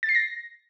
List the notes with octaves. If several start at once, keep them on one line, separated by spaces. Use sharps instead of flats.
A6
C7
A#6